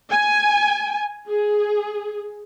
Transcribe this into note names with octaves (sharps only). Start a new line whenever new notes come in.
G#5
G#4